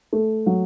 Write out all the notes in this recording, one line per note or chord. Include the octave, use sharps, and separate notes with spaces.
A3
F#3